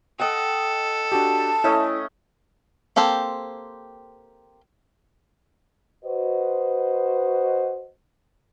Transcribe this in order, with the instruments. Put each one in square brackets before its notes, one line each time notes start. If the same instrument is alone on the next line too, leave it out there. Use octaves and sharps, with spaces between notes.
[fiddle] A4 [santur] D#5 F#5 G5
[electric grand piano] D4 F#4 G4 [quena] A5
[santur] A3 C#4 D#5 [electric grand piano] E4
[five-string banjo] A#3 C4 G4 A4 C5
[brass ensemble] F#4 B4 C5 D#5